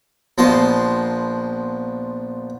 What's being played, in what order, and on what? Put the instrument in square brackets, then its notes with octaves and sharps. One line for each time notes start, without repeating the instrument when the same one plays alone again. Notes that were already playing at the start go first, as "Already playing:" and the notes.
[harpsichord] A#1 F3 B3 D#5 A5 C6